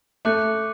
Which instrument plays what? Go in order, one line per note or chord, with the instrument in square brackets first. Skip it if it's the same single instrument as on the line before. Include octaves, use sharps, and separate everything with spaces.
[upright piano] A3 [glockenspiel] D6 F#6 C#7